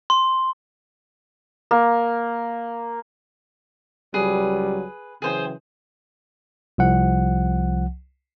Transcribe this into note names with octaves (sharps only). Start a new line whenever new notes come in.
C6
A#3
C#2 F#3 G3 G#4 B4
C#3 E3 F#3 G#4 C5 G5
C2 F3 F#5